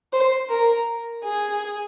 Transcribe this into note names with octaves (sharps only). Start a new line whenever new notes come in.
C5
A#4
G#4